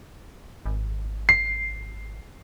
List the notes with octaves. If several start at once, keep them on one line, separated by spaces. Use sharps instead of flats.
G#1
C7